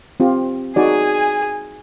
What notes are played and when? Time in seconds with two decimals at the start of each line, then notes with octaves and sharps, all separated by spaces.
0.20 C4 F4 G4
0.76 D#4 F#4 G#4 D5 G#5